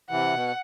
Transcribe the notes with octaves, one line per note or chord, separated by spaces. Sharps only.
C3 E3 F#5
B2